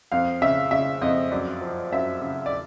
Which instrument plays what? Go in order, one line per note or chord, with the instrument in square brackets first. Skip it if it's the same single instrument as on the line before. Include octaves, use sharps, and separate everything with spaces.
[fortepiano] F2 F5
C#3 E5
C#3 E5
F2 D#5
F#2 D5
F3
F#2 E5
C#3
D5